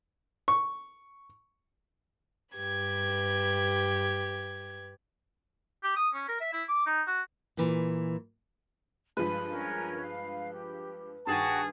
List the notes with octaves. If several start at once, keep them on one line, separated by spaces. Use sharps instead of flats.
C#6
G2 G4 B4 G#6
G4
D#6
C#4
A#4
E5
E4
D6
D#4
F#4
A#2 E3
G2 F3 G#3 B4 B5
C#4 A#4
F5
G4
G2 D#3 F#4 G#4 G5 A5 C#6